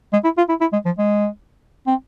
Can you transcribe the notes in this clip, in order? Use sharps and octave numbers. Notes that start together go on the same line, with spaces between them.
G#3
E4
F4
E4
E4
G#3
F3
G#3
C4